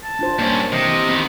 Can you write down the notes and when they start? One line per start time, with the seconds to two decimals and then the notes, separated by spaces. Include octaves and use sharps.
0.04 A5
0.19 D4 F4 C5
0.39 G2 A#3 C#4
0.72 C3 E3 C5 D#5
1.09 D#3 B3 C4